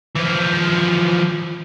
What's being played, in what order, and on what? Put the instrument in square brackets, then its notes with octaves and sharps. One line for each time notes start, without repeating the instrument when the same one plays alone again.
[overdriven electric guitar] E3 F3